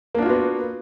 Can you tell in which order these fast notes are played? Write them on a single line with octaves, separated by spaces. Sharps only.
A#3 D4 F4 F#4 B3